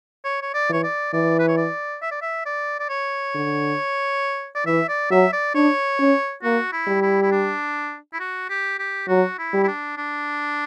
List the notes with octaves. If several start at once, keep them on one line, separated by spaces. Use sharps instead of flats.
C#5
C#5
D5
E3 C#5
D5
E3 D5
B4
C#5
D5
E5
D5
E5
D5
D5
C#5
D3
D5
E3 E5
D5
F#3 E5
D5
D4 C#5
C#4
A#3 F#4
E4
G3
E4
E4
D4
E4
F#4
G4
G4
F#3 F#4
E4
G3
E4
D4
D4